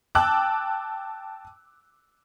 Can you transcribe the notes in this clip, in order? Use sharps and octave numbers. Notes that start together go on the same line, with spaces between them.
G5 A5 D6 E6 F#6